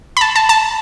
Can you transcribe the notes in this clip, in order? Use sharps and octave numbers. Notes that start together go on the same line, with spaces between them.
B5
A5
A5
A5